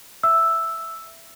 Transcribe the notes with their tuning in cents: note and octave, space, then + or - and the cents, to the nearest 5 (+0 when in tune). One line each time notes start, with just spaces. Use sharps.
E5 +10 E6 +0